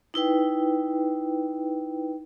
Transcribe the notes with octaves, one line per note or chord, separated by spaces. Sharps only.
D#4 E4 B4 G5